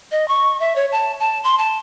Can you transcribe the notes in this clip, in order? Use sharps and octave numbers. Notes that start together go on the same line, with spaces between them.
D#5
C#6
E5
C#5
A5
A5
C6
A5